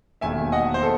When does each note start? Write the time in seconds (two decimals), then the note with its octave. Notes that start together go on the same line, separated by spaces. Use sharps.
0.21 E1 D#2 D#3 A3 E5 G#5
0.52 D#5 F#5
0.74 C5
0.83 A4